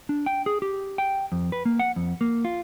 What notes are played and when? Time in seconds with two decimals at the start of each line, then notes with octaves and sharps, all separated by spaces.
0.09 D4
0.26 G5
0.46 G#4
0.62 G4
0.98 G5
1.32 F2
1.52 B4
1.65 A#3
1.79 F#5
1.96 F2
2.21 A#3
2.45 F4